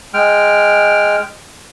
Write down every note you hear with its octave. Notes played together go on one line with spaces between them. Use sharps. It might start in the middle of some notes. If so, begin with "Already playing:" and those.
G#3 G5 F6